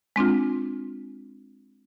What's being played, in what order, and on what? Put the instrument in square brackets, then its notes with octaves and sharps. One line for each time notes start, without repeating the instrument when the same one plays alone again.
[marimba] G#3 C4 D4 F4